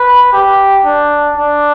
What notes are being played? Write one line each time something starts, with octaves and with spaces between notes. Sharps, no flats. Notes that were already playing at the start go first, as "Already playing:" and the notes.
Already playing: B4
G4
D4
D4